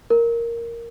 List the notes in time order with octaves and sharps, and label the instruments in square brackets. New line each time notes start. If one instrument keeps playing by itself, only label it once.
[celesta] A#4